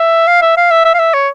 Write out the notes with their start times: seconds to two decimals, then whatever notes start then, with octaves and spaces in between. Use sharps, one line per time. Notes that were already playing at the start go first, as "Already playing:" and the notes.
Already playing: E5
0.28 F5
0.42 E5
0.57 F5
0.71 E5
0.85 E5
0.94 F5
0.99 E5
1.14 C#5